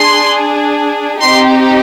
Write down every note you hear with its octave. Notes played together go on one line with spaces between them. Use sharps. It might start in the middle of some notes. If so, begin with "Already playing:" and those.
Already playing: D4 G#4 C6
C4 D#4 G4 C6